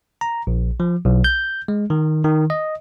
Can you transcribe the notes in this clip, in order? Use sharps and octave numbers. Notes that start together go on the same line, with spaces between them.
A#5
A#1
F3
B1
G6
G#3
D#3
D#3
D#5